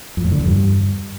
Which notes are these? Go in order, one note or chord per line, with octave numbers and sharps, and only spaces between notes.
F2
A2
D3
E2
G2